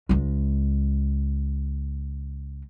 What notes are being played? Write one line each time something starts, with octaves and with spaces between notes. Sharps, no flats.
C#2 G#3